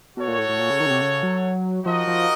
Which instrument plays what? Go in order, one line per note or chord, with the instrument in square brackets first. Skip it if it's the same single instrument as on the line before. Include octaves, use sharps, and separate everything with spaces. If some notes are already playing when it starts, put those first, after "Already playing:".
[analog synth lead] B2 [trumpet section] F#4 A4 C#5
[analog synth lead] A#2
A2
A2
A#2
C#3
D#3
C#3
C3
C#3
F#3
[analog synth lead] F3 [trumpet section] D#4 F#4 A#4 D#5
[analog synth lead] F3